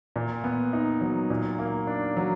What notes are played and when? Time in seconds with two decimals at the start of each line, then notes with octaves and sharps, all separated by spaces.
0.16 A#2
0.44 B3
0.73 D#4
1.01 F#3
1.30 A#2
1.59 A#3
1.87 D4
2.17 F#3